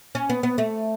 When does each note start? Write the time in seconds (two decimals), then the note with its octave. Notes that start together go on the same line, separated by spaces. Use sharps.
0.15 C#4
0.29 B3
0.43 B3
0.58 A3